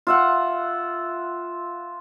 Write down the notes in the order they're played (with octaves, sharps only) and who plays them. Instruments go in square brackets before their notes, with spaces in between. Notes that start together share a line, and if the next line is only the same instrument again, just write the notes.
[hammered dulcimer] F4 E5 F#5